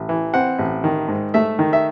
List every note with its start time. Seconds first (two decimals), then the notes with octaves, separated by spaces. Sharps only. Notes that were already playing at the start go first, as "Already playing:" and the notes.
Already playing: A1
0.09 E3
0.34 C4 F#5
0.59 A1
0.84 D#3
1.08 G#2
1.34 A3 E5
1.59 D#3
1.73 E5